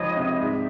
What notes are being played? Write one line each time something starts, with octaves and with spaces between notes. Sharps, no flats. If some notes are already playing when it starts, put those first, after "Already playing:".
Already playing: C#2 D#3 F3 C#5 D#5
C3
G#2 D5 E5